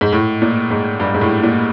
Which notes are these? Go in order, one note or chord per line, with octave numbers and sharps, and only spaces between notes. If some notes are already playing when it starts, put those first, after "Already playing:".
G#2
A2
A#2
G#2
G2
G#2
A2
A#2